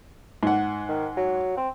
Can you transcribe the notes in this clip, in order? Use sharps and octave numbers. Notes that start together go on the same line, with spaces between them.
G#2 F#5
D#3
F#3
C4